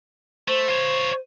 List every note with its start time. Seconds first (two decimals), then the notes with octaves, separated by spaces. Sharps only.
0.48 A3 C5
0.68 F4 C#5